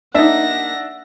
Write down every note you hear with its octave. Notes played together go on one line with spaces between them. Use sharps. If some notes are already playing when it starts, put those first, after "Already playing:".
A#3 D4 D#4 E5 F#5 A#6